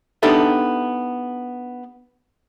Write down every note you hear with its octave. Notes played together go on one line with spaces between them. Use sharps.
B3 D4 D#4 G4 A4 E5